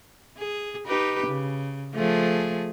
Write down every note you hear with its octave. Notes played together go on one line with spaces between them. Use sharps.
G#4
D#4 G4 B4
C#3
F3 A3 G#4